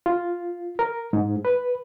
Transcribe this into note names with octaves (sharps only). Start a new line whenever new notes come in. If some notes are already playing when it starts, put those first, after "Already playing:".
F4
A#4
G#2
B4